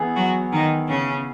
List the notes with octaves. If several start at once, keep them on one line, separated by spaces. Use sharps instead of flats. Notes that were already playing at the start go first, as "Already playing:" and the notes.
Already playing: E3 B3 E4 G#4
F#3 F#4
D#3 D#4
C#3 C#4